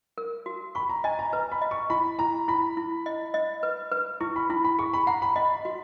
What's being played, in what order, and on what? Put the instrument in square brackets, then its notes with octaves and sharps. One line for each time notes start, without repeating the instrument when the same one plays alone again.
[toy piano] A#4
F#4
[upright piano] B5 [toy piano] C#6
[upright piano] A#5
[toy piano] D#5 [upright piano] G#5
[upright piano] A#5
[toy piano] B4 [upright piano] A#5
[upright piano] B5
[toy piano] D#5
[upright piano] C#6
[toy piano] E4 [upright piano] B5
[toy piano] E4 [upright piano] A#5
[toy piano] E4 [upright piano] B5
[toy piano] E4
D#5
D#5
B4
B4
[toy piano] E4 [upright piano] C#6
[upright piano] B5
[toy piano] E4 [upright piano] B5
[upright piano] B5
[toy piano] G#4 [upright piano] C#6
[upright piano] B5
[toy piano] F#5 [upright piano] A#5
[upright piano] B5
[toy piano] D#5 [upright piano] B5
[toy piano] F#4